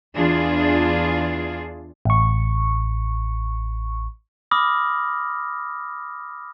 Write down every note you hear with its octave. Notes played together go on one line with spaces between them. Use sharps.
E2 D4 F4 G#4
A1 C#6
B5 D6 D#6 F6 A#6